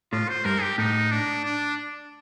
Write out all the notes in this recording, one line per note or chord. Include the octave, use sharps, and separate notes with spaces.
A2 F4
C5
G2 A#4
G4
A2 D#4
D4
D4